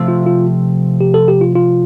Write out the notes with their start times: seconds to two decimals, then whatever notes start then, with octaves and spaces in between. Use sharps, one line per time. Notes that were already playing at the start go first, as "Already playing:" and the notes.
Already playing: C3 F3 A3 C4
0.08 F4
0.26 F4
1.01 G4
1.14 A4
1.28 G4
1.41 F4
1.55 F4